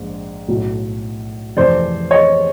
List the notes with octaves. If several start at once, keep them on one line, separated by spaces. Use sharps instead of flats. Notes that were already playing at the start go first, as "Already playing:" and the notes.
Already playing: A#1 G#2
B1 A2 F#3 A3
F2 C3 E3 A3 C5 D5
C#5 D#5